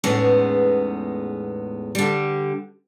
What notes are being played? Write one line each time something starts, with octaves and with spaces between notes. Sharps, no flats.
E2 A2 G#3 B3 C#4 D#4
D3 G3